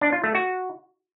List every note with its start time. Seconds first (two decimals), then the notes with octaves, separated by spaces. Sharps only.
0.01 D4
0.12 F4
0.24 A3
0.35 F#4